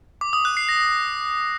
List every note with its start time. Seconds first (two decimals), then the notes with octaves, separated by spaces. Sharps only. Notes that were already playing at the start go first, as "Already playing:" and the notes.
0.21 D6
0.33 D#6
0.45 F#6
0.57 C7
0.69 A#6